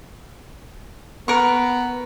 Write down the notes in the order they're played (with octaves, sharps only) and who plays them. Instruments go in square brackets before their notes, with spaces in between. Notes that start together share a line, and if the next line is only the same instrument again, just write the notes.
[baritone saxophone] B3 [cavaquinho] A#4 C#6